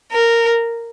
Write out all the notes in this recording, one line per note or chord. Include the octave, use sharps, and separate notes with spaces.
A#4